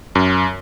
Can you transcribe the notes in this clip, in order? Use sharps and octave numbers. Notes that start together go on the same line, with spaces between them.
F#2